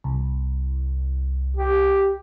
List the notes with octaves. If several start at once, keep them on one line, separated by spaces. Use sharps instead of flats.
C2
G4